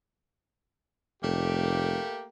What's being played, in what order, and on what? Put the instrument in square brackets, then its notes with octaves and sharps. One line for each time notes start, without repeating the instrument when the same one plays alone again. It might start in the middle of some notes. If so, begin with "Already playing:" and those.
[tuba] F1 [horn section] A3 A#3 G4